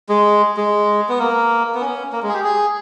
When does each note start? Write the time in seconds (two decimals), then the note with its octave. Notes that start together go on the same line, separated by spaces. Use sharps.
0.09 G#3
0.57 G#3
1.09 B3
1.19 A#3
1.75 B3
1.81 C#4
2.13 A#3
2.23 G#3
2.29 G#4
2.34 G4
2.44 G#4